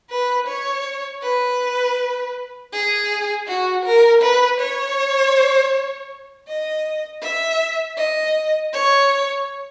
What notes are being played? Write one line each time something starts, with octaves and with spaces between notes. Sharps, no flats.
B4
C#5
B4
G#4
F#4
A#4
B4
C#5
D#5
E5
D#5
C#5